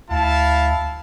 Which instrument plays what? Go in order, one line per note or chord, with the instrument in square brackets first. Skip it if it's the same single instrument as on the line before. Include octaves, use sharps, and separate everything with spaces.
[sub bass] D2 [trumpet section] E4 F5 A5